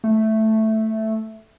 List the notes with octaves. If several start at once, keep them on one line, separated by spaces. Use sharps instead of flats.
A3